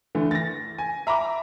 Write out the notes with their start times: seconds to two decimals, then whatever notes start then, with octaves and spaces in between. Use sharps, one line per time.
0.15 D3 E3 A3
0.31 A6 A#6
0.78 G#5
1.07 E5 A#5 B5 D6